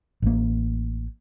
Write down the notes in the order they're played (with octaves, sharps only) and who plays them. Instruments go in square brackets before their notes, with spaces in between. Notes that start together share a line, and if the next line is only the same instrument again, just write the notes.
[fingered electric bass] A1 A#3